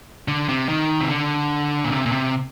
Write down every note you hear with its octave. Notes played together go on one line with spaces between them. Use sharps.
D3
C3
D#3
C3
D3
A#2
C3
A#2
C3